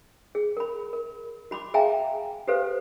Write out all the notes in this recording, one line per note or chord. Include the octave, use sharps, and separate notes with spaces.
G#4
A#4 B5
A#4
F#4 B5 C6 D6
G#4 E5 F5 G5 G#5 A#5
G4 A4 B4 C5 F5